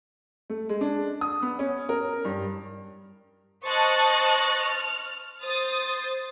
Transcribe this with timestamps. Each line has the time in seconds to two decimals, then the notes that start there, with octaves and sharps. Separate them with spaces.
0.50 A3
0.69 G#3
0.81 D4
1.21 D#6
1.42 B3
1.59 C#4
1.89 A#4
2.25 G2
3.66 C5 D#5 A5 C#6 F#6 A6
4.62 F6
5.43 C5 D#6 A6